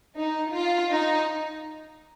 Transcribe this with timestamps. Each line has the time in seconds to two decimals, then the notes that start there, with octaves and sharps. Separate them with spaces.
0.17 D#4
0.54 F4
0.93 D#4